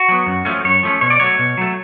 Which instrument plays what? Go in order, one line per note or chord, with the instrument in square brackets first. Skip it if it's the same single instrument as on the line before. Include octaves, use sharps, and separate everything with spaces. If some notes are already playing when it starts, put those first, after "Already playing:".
Already playing: [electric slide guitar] F#4
F#3 B3
F#2
F3 A3 C#4
F#2 C#5
F3 A3 C#4
B2 C#5
D5
F#3 A3 C#5
B2
F#3 A3